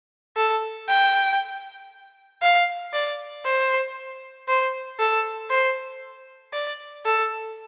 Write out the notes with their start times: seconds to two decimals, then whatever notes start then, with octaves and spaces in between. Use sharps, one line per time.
0.37 A4
0.89 G5
2.42 F5
2.93 D5
3.45 C5
4.48 C5
4.99 A4
5.51 C5
6.53 D5
7.05 A4